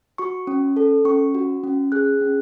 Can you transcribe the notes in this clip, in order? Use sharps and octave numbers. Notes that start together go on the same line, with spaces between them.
F#4 C#6
C#4
A4
C#4 C#6
F#4
C#4
G#4 F#6
C#4